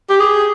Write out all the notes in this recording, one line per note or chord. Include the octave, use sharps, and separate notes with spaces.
G4
G#4